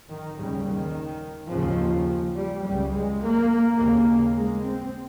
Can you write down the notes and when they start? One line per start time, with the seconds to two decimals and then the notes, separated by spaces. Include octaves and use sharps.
0.10 D#3
0.38 D#2 C#3 G3
0.67 D#3
1.52 D#2 C#3 F3
2.37 G3
2.65 C#2 C#3 G3
2.93 G#3
3.22 A#3
3.78 D#2 C#3 A#3
4.35 G#3
4.63 C4